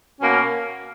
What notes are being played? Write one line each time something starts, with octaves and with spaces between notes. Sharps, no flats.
B2 A#3 C#4